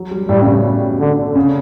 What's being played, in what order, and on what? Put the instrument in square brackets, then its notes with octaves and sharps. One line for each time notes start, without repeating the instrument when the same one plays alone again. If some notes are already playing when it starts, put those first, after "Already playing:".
Already playing: [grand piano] F#3
G3
[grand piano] A2 [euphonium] G3
[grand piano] C#3
B2
[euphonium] D3
[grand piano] C#3